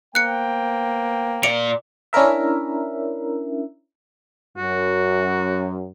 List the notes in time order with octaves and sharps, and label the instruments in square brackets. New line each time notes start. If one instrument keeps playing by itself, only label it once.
[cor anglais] A#3 [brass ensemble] B3 C5 G5 [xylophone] F#6 C#7
[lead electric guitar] A#2 D5 [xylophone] C#7 D7 F7
[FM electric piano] C#4 D4 E4 A#4 E5
[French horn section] F#2 [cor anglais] F#4